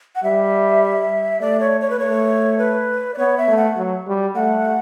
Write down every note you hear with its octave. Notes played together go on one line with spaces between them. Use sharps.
F#5
G3 E5
A3 D5
C#5
C#5
B4
A3 C#5
B4
D5
B3 C#5
E5
A3
F#5
F#3
G3
A3 F#5